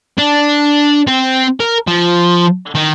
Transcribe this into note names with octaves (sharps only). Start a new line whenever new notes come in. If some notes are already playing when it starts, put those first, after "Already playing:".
D4
C4
A#4
F3
D#3